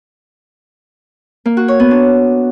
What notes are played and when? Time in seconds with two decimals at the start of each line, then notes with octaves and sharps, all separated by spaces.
1.46 A#3
1.57 F#4
1.68 C#5
1.80 B3
1.91 D4